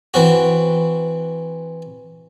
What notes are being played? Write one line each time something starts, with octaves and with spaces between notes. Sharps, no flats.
E3 C4 F#4